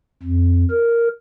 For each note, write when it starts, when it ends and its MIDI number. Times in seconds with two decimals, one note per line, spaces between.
0.22 0.64 41
0.70 1.08 70